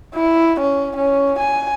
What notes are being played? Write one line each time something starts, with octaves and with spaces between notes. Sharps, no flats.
E4
C#4
C#4
G#5